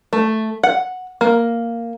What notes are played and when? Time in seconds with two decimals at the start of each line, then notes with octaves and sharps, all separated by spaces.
0.13 A3
0.63 F#5
1.21 A#3